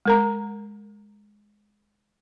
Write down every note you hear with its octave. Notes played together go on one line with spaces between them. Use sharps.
G#3 A#4 A#5